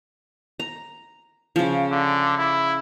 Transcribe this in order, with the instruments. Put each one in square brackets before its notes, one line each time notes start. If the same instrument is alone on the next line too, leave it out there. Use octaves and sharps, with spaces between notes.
[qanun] A#5
C#3 F3
[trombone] D3
E4